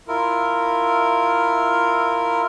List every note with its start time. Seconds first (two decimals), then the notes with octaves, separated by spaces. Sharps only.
0.08 E4 F4 A#4